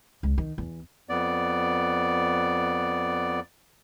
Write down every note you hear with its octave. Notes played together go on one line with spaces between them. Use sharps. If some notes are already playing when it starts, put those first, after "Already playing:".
C#2
D#3
E2
F2 B3 D5